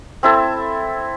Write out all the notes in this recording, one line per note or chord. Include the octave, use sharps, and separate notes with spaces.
C4 E4 A4